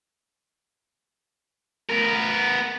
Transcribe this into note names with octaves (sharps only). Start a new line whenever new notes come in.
B3 A#4